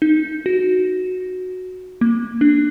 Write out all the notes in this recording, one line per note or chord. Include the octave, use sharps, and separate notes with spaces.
D#4
F#4
A#3
D4